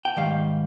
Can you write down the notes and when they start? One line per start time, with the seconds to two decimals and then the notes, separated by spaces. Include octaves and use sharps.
0.05 G5
0.17 G#2 D#3 G3 F5